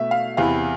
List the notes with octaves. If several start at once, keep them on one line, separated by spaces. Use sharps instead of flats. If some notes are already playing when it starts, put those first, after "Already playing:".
Already playing: B2 A3 E5
F5
E2 C3 E3 B3 F5